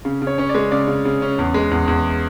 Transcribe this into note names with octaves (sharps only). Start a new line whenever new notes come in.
C#3
C#3
C#5
C#4 C#5
D5
G#3
C#3 D5
C#3
C#3
C#4
E2
G#3
E2
E2